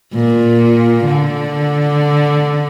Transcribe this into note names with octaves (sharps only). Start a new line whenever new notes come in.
A#2
D3